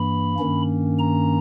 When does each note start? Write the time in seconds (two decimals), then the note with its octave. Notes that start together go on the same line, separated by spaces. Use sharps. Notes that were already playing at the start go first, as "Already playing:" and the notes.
Already playing: G2 E3 A#3 B5
0.39 G2 D#3 A#3 C#4
0.98 A#5